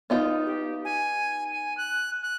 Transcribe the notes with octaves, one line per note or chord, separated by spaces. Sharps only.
B3 D#4 F4
G4
G#5
G#5
F#6
F#6